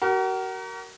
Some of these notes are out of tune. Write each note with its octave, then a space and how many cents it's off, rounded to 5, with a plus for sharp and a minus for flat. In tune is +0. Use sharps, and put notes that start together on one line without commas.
F#4 +40 A#4 +0